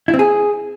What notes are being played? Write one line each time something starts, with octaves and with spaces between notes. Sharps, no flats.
E4
C4
G#4